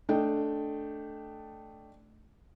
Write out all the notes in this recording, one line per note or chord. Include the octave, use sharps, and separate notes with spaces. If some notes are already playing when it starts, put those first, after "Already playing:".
A3 D4 D#5 G5